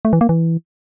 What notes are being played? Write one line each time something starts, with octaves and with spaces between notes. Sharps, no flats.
A3
E3
A#3
E3